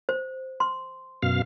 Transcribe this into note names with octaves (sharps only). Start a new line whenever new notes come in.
C5
C6
F#2 B2 F5